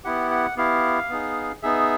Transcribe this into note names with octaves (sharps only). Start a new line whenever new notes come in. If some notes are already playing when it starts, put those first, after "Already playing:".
B3 E4 G4 F#5
F#5
B3 E4 G4 F5
B3 D#4 G#4
B3 D#4 G#4 E5